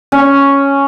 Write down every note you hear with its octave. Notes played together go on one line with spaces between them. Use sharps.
C#4